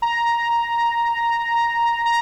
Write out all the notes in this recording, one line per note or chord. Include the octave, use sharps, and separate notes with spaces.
A#5
A#5